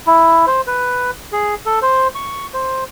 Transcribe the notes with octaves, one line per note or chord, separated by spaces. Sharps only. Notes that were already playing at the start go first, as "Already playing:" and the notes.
E4
C5
B4
G#4
A4
C5
C#6
C5